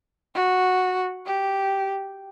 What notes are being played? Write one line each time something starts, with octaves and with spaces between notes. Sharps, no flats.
F#4
G4